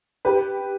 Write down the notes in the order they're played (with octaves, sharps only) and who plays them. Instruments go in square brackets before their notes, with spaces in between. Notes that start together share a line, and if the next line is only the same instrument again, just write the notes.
[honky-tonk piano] G4 B4